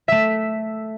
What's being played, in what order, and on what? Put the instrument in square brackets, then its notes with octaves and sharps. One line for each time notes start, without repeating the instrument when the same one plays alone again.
[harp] A3 E5